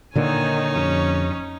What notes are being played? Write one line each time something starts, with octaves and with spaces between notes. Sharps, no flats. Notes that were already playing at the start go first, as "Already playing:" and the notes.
A#2 D3 D#3 A#3 D#4 C#5 G#5
F2 C#4 G4